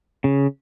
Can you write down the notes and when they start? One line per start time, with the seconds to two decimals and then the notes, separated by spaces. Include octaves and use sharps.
0.24 C#3